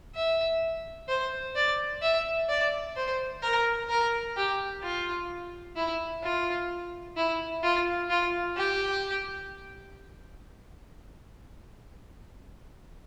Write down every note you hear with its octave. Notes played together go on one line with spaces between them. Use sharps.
E5
C5
D5
E5
D5
C5
A#4
A#4
G4
F4
E4
F4
E4
F4
F4
G4